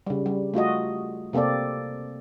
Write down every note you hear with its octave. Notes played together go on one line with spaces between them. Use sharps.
C#3 G3
G3
A3 F4 F#4 D#5
C3 A#3 C4 A4 D5